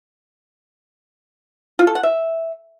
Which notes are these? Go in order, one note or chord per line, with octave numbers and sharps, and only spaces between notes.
F4
A4
F#5
E5